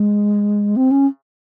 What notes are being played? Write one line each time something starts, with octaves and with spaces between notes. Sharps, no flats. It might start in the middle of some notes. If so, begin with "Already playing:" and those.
Already playing: G#3
C4
C#4